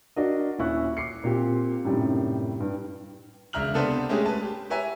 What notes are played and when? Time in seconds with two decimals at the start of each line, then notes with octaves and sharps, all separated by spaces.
0.16 D4 F#4 A#4 D#5
0.59 D#1 C#4 E4 C#6 F#6
0.97 D6 C7 C#7
1.24 A#2 C4 F4 G4
1.85 F#2 A2 C3 D#3 G3
2.60 G2
3.53 E1 C#2 E5 A#5 F6 F#7
3.74 C3 B3 D4 A4 B4 C5
4.09 G#3 A3 C#4 G4 G#4
4.26 B4 A5
4.43 G4
4.70 G4 B4 C#5 E5 G#5 A#5